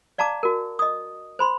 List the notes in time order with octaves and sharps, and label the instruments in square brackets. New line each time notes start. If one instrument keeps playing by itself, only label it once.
[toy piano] D5 F5 A5 A#5 D6
F#4 A#4
D#5 D#6
C5 B5 C6